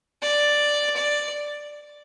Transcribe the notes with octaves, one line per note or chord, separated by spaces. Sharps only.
D5
D5